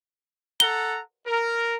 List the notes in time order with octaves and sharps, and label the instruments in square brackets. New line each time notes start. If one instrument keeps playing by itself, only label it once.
[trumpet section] A4 F#5 A#5 [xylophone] G7
[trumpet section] A#4